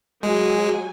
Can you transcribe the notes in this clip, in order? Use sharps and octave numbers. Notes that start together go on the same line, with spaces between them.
F#3 G#3 G#5